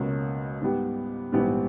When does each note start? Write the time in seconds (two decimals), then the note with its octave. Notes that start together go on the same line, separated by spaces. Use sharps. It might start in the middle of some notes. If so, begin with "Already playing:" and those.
Already playing: C#2 B2 A#3 C#4
0.62 G#2 G3 B3 G4
1.33 A#1 G#2 E3 G3 B3